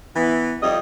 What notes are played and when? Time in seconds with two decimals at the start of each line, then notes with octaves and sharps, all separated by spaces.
0.16 E3 B3
0.62 F2 C3 G3 D#5